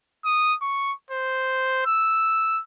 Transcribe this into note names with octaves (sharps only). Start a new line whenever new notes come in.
D#6
C#6
C5
E6